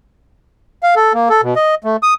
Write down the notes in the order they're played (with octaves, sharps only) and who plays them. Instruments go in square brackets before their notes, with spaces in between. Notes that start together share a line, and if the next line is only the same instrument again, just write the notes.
[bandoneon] F5
A4
A#3
A4
B2
D#5
A3
D#6